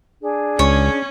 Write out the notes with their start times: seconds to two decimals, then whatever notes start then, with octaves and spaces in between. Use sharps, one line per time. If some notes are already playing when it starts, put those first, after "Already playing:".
0.21 D4 G#4
0.59 C#2 C#4 C#5